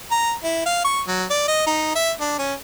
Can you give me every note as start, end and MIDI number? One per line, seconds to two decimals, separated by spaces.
0.11 0.33 82
0.44 0.64 64
0.66 0.80 77
0.85 1.01 85
1.07 1.24 54
1.30 1.45 74
1.48 1.65 75
1.67 1.94 63
1.95 2.11 76
2.21 2.34 62
2.39 2.54 61